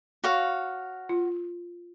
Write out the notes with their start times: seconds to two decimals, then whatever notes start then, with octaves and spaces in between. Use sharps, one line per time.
0.24 F#4 C#5 F5
1.09 F4